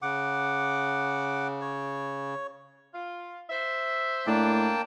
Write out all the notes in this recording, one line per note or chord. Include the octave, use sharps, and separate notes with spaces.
C#3 F#5 D6
C#5
F4
C5 E5
A2 A#3 D4 G5 A5